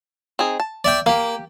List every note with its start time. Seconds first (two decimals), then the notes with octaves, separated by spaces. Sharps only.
0.39 C4 D#4 G#4
0.60 A5
0.84 D5 E5 G5
1.06 A#3 G4 F5